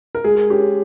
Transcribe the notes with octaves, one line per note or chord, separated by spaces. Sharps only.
A#4
G#3 G#4
C#4 G4